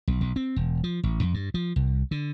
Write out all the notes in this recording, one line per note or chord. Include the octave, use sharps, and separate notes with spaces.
B1
B1
C4
E1
F3
A1
F2
G2
F3
C2
D3